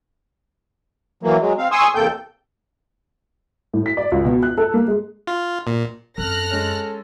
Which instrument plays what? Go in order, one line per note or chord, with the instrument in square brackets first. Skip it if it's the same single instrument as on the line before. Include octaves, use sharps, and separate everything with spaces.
[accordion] E3 F#3 A#3
F#3 G#3
C4 F5
G#5 C6 C#6 D#6 E6
E2 C3 A#3 A4 G5 G6
[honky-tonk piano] A2
B6
D5
C#2
B2
F#6
A4
A#3
G#3
[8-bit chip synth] F4
A#2
[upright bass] F#2 C4 [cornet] A4 [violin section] F6 F#6 A#6
[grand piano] G#3 C#4